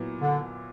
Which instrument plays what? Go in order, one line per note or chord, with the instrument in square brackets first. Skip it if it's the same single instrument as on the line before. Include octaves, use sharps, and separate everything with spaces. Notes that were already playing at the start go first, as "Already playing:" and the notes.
Already playing: [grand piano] A#2 F#3 B3 E4
[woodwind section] D3